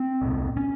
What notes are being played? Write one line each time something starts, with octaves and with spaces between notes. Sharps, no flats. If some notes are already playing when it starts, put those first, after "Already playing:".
Already playing: C4
C2 A#2
C#4